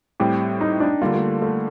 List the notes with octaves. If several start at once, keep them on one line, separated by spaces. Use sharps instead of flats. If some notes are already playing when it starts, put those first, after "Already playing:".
A2 G3 C4 G4
D#4
D4
D3 G3 A#3 F4
A3
A3